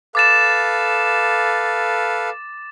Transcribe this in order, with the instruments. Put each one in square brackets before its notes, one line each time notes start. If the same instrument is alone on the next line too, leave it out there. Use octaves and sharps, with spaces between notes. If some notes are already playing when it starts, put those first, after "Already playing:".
[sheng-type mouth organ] A4 B4 F5 [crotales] D6 A6 E7